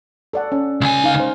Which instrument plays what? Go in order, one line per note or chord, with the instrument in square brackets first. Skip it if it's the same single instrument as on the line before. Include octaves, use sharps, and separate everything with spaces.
[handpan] A4 D5 F#5
C#4
[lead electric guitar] C#2 G#5
[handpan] D#4 F5
C5